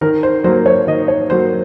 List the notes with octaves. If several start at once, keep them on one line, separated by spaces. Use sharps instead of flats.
D#3 A#4
C5
F#3 A#3 C5
C#5
D#3 D#5
C#5
F#3 A#3 C5